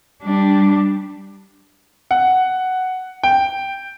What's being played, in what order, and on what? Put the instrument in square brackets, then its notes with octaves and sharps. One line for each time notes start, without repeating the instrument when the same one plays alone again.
[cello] G3 D4
[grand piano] F#5
G5